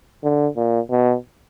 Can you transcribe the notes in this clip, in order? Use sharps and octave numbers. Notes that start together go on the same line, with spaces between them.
D3
A#2
B2